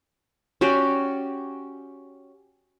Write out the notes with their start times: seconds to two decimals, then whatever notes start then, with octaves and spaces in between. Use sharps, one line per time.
0.61 C#4 F#4 G4 D5